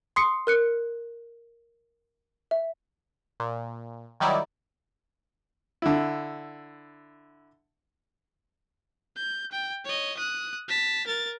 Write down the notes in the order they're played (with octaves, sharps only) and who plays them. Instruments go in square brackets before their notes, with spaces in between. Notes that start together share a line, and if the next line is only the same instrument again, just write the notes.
[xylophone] C6 D#6 C7 C#7
A#4 F#6 C#7
E5
[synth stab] A#2
D#3 F#3 G3 D#4 E4 D5
[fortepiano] D3 E4
[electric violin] G6
G5
C#5 D#5
D#6 F#6
A5 B6
A#4 A6